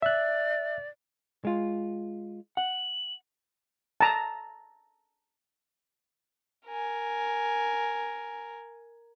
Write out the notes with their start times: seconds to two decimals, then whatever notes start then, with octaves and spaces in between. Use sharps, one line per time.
0.02 D5 E5 F#6
1.45 G#3 F4
2.57 F#5 F#7
4.01 A5 A#5
6.67 A#4 G#5